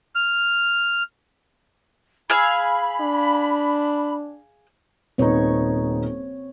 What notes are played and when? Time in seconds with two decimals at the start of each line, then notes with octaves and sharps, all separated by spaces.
0.15 F6
2.30 G#4 F5 B5 E6
3.01 D4
5.18 D#1 B3 C4 D#4 C#5